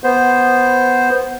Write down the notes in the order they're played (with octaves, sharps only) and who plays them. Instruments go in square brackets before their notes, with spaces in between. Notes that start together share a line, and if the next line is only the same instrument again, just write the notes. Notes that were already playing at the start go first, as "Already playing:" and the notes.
[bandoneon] B3 C5